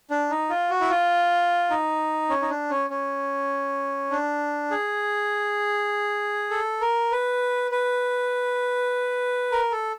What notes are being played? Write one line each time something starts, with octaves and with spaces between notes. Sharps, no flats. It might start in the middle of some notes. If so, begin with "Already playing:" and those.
D4
D#4
F4
F#4
E4
F4
D#4
C#4
D#4
D4
C#4
C#4
D4
G#4
A4
A#4
B4
B4
A#4
A4